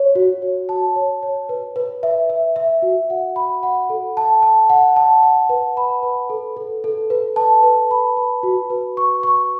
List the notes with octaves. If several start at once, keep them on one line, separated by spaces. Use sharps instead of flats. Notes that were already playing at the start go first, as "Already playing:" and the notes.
Already playing: C#5
F#4
C#5
A5
C#5
C#5
B4
B4
E5
E5
E5
F#4
F#5
B5
F#5
A4
A5
A5
F#5
A5
F#5
B4
B5
B4
A4
A4
A4
B4
A5
B4
B5
B4
F#4
B4
C#6
C#6